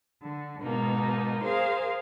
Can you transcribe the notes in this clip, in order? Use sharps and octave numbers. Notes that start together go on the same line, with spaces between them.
D3
G#2 B2 A#3 D#4
G#4 A#4 C5 F5